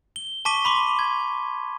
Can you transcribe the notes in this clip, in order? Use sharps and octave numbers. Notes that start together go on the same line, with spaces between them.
G7
A5 C#6 D6 B6 D#7 G7
B5 C6 D6
G#6